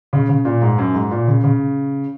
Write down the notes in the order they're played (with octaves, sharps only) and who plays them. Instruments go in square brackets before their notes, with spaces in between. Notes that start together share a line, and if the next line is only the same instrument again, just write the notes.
[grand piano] C#3
C#3
A#2
G#2
F#2
G#2
A#2
C#3
C#3